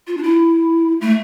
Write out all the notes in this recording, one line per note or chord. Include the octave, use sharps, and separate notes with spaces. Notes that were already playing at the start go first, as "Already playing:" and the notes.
F4
D4
E4
A3